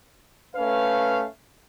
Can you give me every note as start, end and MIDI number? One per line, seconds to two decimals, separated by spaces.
0.55 1.24 57
0.55 1.24 61
0.55 1.24 71
0.55 1.24 77